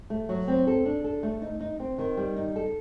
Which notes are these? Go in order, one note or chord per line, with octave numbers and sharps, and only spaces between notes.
A3
F#3
C4
A4
D4
A4
A3
D#4
D#4
C4
D#3
G3
D#4
A4